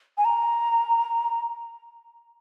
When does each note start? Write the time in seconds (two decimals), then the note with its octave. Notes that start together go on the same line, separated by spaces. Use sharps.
0.18 G#5
0.25 A#5